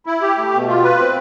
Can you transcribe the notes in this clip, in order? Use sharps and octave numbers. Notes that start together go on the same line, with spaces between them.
E4
G4
A3
B2
F4
B4
C4